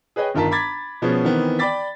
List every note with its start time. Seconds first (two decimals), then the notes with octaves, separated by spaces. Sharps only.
0.16 G#4 B4 C#5 D#5 G5
0.35 G1 D#3 F4 A#4 A5 B6
0.51 A#5 B5 D6 G#6 A6 B6
1.02 B2 F3 B3 C#4 G#4
1.25 D#3 E3 B3 C4
1.59 D5 G5 B5 D6 A6 B6